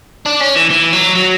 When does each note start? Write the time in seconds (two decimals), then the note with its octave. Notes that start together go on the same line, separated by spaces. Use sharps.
0.26 D4
0.40 C#4
0.56 E3
0.71 E3
0.93 F#3
1.15 F#3